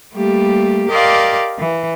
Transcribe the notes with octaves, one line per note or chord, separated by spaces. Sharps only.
G3 A3 A#3 G4
G4 A#4 D5 D#5 F5 C6
E3